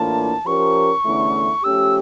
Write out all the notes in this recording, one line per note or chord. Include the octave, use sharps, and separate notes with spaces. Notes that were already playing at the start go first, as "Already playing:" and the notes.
Already playing: A2 E3 A#3 D4 F4 A5
F3 C#4 G4 A#4 C#6
E2 D3 A3 C#4 E4
F3 A3 C#4 G4 E6